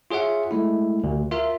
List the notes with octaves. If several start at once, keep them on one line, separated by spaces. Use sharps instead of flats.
F4 G#4 C#5 E5 F#5
G#3 A3 E4
D2
F4 A#4 E5